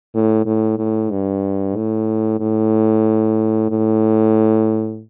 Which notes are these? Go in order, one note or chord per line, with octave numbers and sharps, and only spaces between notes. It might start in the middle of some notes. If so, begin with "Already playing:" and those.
A2
A2
A2
G2
A2
A2
A2